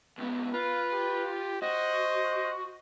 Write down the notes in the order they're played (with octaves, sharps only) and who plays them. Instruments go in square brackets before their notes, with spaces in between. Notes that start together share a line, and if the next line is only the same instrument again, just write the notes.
[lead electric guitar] C#2 B3
[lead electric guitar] F4 [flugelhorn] B4 [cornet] F5
[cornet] G4
[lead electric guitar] F#4 [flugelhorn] C5 [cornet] D#5